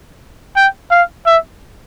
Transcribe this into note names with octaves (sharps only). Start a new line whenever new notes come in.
G5
F5
E5